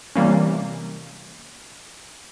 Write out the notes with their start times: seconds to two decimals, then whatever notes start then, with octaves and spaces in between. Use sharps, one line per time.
0.16 C3 E3 G3 A#3 C#4